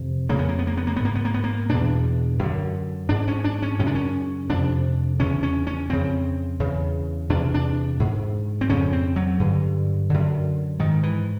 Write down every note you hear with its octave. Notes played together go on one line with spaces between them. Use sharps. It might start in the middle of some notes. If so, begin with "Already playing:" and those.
Already playing: F2 C3
F2 C#3 A#3
B3
A#3
B3
A#3
B3
A#3
B3
G#2
A#3
B3
A#3
B3
A#3
E2 B2 D4
F#2 D3
G#2 D4
C#4
D4
C#4
F#2 C#3 C#4
D4
C#4
F2 C3 D4
E2 C#3 C#4
C#4
C#4
F2 C#3 C4
E2 C#3
E2 C3 D4
D4
G#2
C4
F2 C#3 C#4
C4
F#3
G2 D3
F#2 D3
G#2 D#3
E3